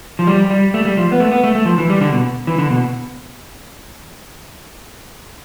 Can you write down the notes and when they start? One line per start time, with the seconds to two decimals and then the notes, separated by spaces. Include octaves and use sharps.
0.19 F3
0.27 G3
0.50 G3
0.74 A3
0.85 G3
0.97 F3
1.12 B3
1.20 A3
1.32 B3
1.44 A3
1.55 A3
1.66 F3
1.78 E3
1.90 G3
2.01 D3
2.13 B2
2.47 E3
2.58 D3
2.70 B2